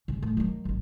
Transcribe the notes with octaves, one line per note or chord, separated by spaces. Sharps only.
G2 C#3
A2
D#3 F#3
D1 G#1